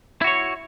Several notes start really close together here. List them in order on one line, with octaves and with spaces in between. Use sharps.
E4 F#4 C#5